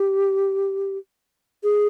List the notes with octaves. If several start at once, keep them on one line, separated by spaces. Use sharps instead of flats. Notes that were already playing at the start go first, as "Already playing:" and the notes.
Already playing: G4
G#4